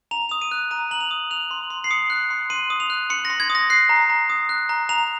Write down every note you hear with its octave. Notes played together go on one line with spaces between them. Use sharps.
A#5 F7
D#6 F7
D#7
F#6
A#5 D#7
A#5 F#7
F7
D#6
F#6 F7
C6
C6
C7
D#6 C#7
F#6
C6
C6 D#7
D#6
F7
F#6
C6 C#7
A#6
C6
G#6
D#6
A#6
F#6 C7
A#5
A#5
D#6
F#6
A#5
A#5 F7